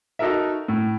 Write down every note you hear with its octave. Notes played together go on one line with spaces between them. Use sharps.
D#4 F#4 A4 A#4 E5
A2